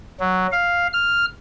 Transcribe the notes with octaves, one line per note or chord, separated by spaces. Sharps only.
F#3
F5
F6